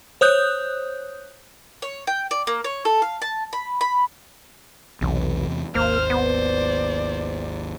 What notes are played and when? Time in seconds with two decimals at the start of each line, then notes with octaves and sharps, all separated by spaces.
0.21 C5 C#5 D#6 F#6 G6
1.82 C#5
2.07 G5
2.31 D5
2.47 A#3
2.64 C#5
2.85 A4
3.02 F5
3.22 A5
3.53 B5
3.81 B5
5.01 B1 E2 C3
5.75 G#1 D#2 A#3 C5 F6
6.10 B3 D5